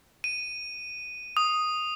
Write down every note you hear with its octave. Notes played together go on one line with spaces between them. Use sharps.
D#7
D#6